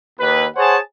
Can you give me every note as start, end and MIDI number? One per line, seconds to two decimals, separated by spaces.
0.20 0.46 39
0.20 0.46 71
0.57 0.79 68
0.57 0.79 72
0.57 0.79 73
0.57 0.79 78
0.57 0.79 80
0.57 0.79 81